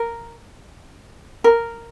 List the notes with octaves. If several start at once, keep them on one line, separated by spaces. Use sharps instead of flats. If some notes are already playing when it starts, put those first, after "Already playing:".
Already playing: A#4
A#4